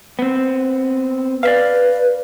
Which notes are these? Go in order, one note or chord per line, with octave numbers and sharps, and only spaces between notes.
B3 C4
B4 D5 E5 F5